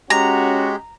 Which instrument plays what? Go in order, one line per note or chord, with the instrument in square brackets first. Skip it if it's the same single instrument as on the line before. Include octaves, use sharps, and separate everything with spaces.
[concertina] G#3 G4 [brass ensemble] C#4 F#4 [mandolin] A#5